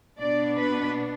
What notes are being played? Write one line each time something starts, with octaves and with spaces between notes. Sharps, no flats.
B2 B3 D4 D5
B4